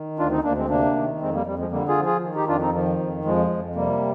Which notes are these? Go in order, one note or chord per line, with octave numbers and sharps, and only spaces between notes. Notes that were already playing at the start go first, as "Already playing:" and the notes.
Already playing: D#3
D2 D4 F4
C4 D#4
D2 A#3 D4
G#3 C4
C3 A#3 D4
D#3
F2 G#3 C4
G3 A#3
F2 G3
F3 G#3
D3 G3 A#3
F4 G#4
F3
F4 G#4
D#3
D#4 G4
F2 D4 F4
C4 D#4
D#3 F3
F2
F2 F3 G#3
F2
C3 G3 A#3